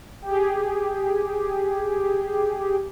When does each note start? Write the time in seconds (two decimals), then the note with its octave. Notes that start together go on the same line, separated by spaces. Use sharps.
0.22 G4 G#4